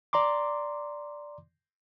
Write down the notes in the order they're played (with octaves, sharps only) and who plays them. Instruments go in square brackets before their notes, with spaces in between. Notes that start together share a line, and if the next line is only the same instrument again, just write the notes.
[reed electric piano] D5 A#5 C6 D6